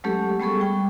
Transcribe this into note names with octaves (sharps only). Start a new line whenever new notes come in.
F#3 G#3 A3 C#4 G4 A4
G3 G#3 B3 G#4 A4 C#6
G3 G5